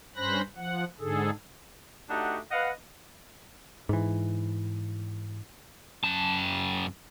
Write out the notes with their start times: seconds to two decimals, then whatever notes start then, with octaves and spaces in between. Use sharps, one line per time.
0.16 G2 C#4 C5 B5 F#6 A#6
0.56 F3 F#5
1.00 G#2 D3 G#4 A4
2.10 A3 D4 D#4 F#4 G4 F#5
2.51 B4 D#5 F5 F#5
3.89 G#2 E3
6.04 F#2 A5